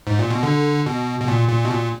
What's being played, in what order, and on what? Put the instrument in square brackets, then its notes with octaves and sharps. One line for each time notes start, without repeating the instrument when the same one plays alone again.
[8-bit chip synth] G#2
A#2
B2
D3
B2
B2
A#2
A#2
B2
A#2